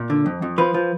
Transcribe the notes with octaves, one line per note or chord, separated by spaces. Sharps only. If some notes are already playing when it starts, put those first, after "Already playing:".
Already playing: A#2
D3
F2
F2
F3 B4
F3